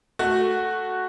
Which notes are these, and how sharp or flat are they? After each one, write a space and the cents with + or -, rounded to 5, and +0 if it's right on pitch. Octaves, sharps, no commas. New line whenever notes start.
A3 +0 F#4 +0